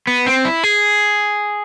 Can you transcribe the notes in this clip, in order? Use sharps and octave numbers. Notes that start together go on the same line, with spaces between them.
B3
C4
E4
G#4